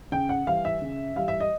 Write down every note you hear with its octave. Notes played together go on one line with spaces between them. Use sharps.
C#3 G5
F#5
E3 G3 F5
E5
C#3
E3 G3 F5
E5
D#5